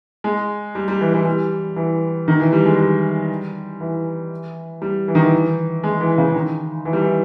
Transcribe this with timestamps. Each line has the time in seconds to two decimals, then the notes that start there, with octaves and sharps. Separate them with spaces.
0.24 G#3
0.75 G3
0.88 G3
1.01 E3
1.14 E3
1.26 G3
1.76 E3
2.28 D#3
2.40 E3
2.53 G3
2.65 G#3
2.79 G3
3.80 E3
4.82 G3
5.08 E3
5.15 D#3
5.22 E3
5.84 G#3
6.00 E3
6.18 C#3
6.35 D#3
6.85 E3
6.93 G3
7.02 E3